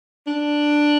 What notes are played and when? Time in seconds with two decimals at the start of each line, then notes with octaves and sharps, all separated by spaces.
0.27 D4